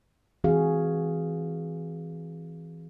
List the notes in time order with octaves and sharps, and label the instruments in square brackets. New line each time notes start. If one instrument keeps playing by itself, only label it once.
[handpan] E3 C4 F#4 G#4 F5